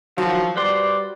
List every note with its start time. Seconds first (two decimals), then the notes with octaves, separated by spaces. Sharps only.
0.18 D#3 F3 F#3 F#4
0.57 G3 B4 C5 D5 C6